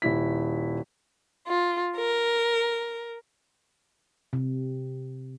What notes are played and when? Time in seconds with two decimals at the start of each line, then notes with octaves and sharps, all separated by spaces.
0.02 D#1 E4 B6
1.47 F4
1.97 A#4
4.33 C3